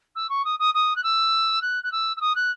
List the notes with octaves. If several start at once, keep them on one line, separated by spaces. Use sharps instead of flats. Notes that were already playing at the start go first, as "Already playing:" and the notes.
E6
C#6
D#6
D#6
D#6
F#6
E6
F#6
F#6
E6
E6
D#6
F#6